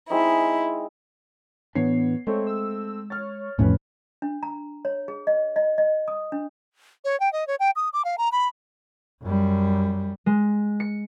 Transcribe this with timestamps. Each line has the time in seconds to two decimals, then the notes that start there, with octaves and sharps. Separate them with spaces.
0.10 G#3 C4 D#4 E4
1.75 A2 E3 B3 D4 C#5 C7
2.27 G#3 A3 C4 A4 C#5
2.47 E6
3.10 C#5 F6 A6
3.59 B1 F2 A2 E3 C#4 B4 C#5
4.22 D4
4.43 A#5
4.85 C#5
5.08 G#4
5.27 D#5
5.56 D#5
5.78 D#5
6.08 D#6
6.32 D4
7.04 C#5
7.20 G5
7.33 D#5
7.47 C#5
7.60 G5
7.76 D#6
7.93 D6
8.05 F5
8.18 A#5
8.32 B5
9.22 F#2 G3
10.26 G#3
10.80 C#7